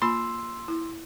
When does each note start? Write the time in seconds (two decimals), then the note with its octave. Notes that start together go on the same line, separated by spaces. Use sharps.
0.02 A#3 F4 B5 C6 E6
0.68 E4